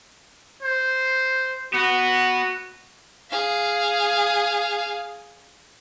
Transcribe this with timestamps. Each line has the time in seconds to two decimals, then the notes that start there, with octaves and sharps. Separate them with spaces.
0.62 C5
1.74 B3 F#4
3.30 G#4 F5